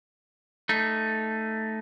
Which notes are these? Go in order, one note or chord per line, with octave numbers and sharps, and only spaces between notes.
A3 D#4